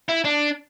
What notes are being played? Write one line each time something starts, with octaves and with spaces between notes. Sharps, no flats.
E4
D4